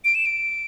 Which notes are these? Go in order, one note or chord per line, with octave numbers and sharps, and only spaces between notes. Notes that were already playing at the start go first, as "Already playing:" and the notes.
D7
E7
D7